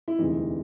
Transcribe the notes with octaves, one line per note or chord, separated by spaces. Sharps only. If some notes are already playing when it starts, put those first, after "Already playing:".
E4
E1 D2 C3 E3 G3 D#4